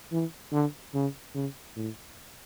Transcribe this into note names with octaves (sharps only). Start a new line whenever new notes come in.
E3
D3
C#3
C#3
A2